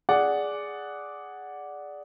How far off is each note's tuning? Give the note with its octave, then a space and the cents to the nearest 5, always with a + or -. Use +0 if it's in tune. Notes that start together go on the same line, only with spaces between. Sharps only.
G#4 +0 D5 -5 F#5 +0